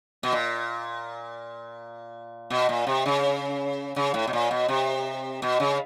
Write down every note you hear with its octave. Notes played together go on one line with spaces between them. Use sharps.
B2
A#2
B2
A#2
C3
C#3
C#3
A2
B2
A#2
B2
C3
B2
C#3